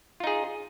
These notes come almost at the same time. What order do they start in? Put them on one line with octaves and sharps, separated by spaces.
F4 D#4 G#4